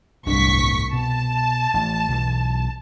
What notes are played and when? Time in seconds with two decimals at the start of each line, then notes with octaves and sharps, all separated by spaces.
0.26 D1 G1 C2 D4 C#6 B6
0.93 B2 A5
1.74 A1
2.08 B1 B2 E3